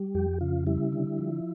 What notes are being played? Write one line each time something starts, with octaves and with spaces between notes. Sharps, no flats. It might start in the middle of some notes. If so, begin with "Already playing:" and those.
Already playing: G3
F2 G4
C#3 F4
G3 E4
D3
F3